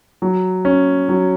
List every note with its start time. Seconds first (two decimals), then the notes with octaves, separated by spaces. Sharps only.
0.22 F#3
0.65 C#4
1.09 F#3